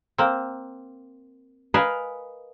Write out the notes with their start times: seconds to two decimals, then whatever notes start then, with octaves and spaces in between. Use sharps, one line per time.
0.18 A#3 C4
1.74 A#4 B4 D#5 F5 G#5